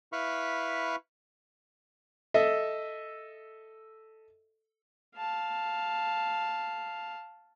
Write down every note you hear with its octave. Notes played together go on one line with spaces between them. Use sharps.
E4 B4 F5 B5 C#6
A4 D#5 E5
F5 A5